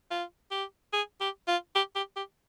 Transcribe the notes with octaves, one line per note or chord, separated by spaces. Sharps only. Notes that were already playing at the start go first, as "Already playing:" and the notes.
F4
G4
G#4
G4
F4
G4
G4
G4